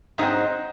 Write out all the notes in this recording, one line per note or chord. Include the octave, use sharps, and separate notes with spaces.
G#2 F#3 C4 D#4 D#5